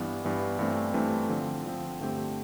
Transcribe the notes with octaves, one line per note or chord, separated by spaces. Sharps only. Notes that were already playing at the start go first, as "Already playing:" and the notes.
Already playing: G2 E3 B3
G2 E3 B3
G2 E3 A3 C4
G2 E3 A3 C4
D3 F3 C4
D3 F3 C4
G2 D3 A3 C4 G4